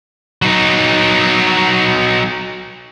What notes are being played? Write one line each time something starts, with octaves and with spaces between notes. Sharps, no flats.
F#3 D#4